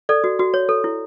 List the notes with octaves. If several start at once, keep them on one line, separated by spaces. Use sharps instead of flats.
A4 D5
F#4
F#4
C#5
A4
E4